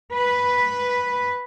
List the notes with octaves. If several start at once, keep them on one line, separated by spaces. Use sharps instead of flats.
B4